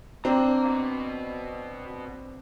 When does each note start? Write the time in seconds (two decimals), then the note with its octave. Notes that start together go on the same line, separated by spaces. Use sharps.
0.25 C4 D4 F5 A#5
0.66 B2 B3